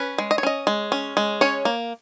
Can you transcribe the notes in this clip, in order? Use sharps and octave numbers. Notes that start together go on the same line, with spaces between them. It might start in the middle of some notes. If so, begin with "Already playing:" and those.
Already playing: C#4 B4
G#3
D#5
C#5
C#4 D#5
G#3
C#4
G#3
C#4 C#5
A#3